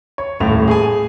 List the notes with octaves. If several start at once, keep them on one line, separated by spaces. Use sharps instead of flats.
C#5
D#1 A2 F7
G#4 G#5